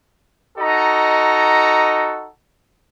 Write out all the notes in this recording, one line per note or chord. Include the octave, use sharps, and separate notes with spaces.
D#4 F#4 A4 D#5 A#5